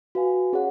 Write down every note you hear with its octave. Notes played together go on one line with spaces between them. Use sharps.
F#4 B4 F5 G#5
C#4 G#4 C#5 F#5